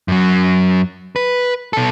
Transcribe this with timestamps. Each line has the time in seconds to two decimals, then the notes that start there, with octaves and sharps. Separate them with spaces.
0.08 F#2 F#3
1.16 B4
1.73 B2 A4